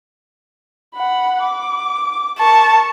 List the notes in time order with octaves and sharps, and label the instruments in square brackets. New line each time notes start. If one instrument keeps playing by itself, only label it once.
[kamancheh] F#5 B5
D6
[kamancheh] A#4 C#6 [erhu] A5